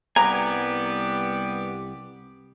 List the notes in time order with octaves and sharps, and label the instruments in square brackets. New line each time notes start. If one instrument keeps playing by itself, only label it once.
[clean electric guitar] C2 G#5 [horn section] G3 B3 [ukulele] A#5 [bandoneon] D6